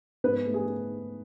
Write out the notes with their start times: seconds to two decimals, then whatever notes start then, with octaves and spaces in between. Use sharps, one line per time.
0.24 G#2 B3 B4
0.46 A3
0.54 G#4